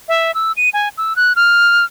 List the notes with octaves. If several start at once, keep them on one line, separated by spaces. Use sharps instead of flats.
E5
E6
D#7
G#5
E6
F#6
F6